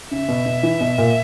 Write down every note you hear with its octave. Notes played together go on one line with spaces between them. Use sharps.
C#3 E5
B2
B2
E3
B2
A#2